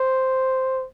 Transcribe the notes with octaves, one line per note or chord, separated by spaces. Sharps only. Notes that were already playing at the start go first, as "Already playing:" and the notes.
Already playing: C5